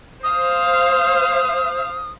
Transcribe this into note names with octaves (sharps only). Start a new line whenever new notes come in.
C5 F5 D#6